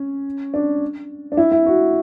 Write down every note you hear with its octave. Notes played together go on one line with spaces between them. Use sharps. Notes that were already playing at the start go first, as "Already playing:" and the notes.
Already playing: C#4
D4
D4
E4
E4
F#4